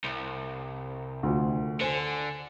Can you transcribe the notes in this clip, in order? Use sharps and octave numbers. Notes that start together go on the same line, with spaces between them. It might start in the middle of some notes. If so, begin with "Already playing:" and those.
C2
D2 D3 F4
D3 C5 G#5